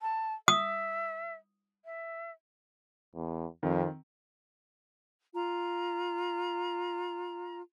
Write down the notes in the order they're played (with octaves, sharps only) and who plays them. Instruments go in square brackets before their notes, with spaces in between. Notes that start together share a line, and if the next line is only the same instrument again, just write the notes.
[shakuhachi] A5
[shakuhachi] E5 [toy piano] D#6
[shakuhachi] E5
[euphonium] E2
[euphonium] F2 [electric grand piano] D#3 C4
[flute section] F4 A#5